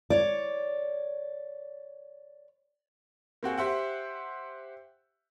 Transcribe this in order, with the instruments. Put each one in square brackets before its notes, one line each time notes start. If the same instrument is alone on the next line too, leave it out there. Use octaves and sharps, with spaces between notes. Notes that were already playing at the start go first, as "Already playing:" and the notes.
[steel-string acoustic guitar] C#5 D5
[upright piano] A#3 C4 F#4 G#4
G4 C5 E5 F#5